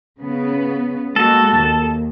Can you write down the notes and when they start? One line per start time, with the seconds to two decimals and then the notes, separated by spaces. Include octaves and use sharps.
0.20 C#3 B3
1.16 G#3 A#3 F#4 A4
1.55 D#2